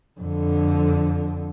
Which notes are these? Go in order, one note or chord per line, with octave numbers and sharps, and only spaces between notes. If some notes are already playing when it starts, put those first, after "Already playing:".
F2 D3